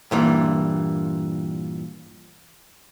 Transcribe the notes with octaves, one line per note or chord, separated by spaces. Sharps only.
G2 A#2 E3